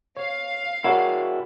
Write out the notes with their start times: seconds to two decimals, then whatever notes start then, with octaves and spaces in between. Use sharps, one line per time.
0.17 C#5 F5
0.84 E4 F#4 G#4 A#4 C#5 D5 F#5